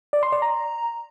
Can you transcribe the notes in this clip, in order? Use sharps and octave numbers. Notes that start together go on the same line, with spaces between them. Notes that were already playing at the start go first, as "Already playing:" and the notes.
D5
C6
D5
A#5